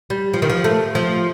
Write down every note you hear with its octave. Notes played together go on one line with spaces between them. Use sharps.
G3
F3
D#3
F3
A3
F3